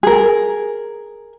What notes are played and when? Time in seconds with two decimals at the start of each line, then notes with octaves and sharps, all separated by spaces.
0.03 G#4 A#4